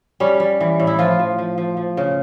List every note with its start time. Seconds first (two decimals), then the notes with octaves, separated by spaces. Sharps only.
0.20 G3 C#4
0.40 G3
0.61 E3
0.80 A2
0.87 E4
0.99 F3 F4
1.19 F3
1.38 F3
1.58 F3
1.77 F3
1.97 C#3